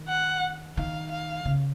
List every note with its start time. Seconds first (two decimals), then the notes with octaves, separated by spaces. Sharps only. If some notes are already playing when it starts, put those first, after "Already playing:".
Already playing: D#3
0.09 F#5
0.77 D#3 F5
1.11 F5
1.45 C#3